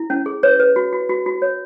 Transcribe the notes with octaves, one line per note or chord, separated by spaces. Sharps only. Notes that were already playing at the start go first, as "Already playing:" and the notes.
Already playing: E4
C#4
G#4
B4 C#5
B4
F#4
F#4
F#4
F#4
C#5